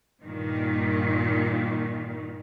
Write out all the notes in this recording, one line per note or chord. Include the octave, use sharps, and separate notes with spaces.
G2 A#2 D#3